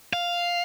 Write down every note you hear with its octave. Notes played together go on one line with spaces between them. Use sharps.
F5